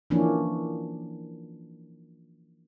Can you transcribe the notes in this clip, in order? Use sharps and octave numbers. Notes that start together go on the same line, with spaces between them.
E3 F3 A#3 C#4 D4